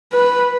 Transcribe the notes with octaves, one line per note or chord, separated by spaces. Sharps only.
B4